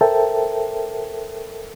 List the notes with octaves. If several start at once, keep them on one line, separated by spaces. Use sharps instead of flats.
A4 A#4 C5 E5 G5 A5